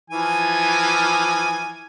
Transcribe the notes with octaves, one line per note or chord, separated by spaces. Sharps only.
E3 F3 G#5